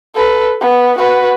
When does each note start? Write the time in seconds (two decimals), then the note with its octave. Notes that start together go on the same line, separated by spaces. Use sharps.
0.15 A4 B4
0.61 B3
0.98 F#4 B4